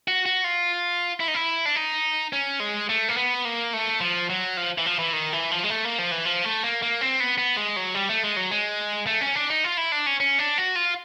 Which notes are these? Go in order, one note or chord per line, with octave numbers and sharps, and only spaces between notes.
F#4
F#4
F4
E4
D#4
E4
D4
D#4
C#4
G#3
A3
A#3
B3
A#3
A3
F3
F#3
F3
E3
F3
E3
D#3
E3
F3
G#3
A3
A#3
F3
E3
F3
A3
A#3
A#3
C4
B3
B3
G#3
F#3
G3
A3
G#3
F#3
G#3
A3
C#4
D4
D#4
F4
E4
D4
C#4
C#4
D4
F#4
F4